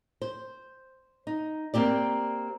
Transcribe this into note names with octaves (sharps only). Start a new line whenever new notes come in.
C5
D#4
A#3 C4 G4 D5